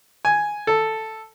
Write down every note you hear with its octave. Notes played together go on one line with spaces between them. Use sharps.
G#5
A4